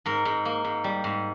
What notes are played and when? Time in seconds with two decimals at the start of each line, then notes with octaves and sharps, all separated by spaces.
0.06 G#2 A#4
0.25 G#2
0.45 A#3
0.64 G#2
0.84 G3
1.04 G#2